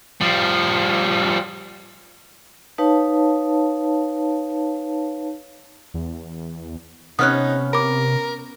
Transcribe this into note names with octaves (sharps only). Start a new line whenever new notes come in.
F3 G3
D#4 B4 C#5 F5 A5
E2
C3 B3 C#4 D#4 D#6 F6 F#6
A#4 B5 D6